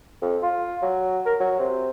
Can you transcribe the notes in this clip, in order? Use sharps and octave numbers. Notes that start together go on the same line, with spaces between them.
F2
F4
F#3
A#4
F#3
C3